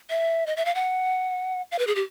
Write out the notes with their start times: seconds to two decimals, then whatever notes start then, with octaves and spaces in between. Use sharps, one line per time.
0.10 E5
0.46 D#5
0.56 E5
0.65 F5
0.75 F#5
1.72 F5
1.79 B4
1.87 G#4
1.95 G4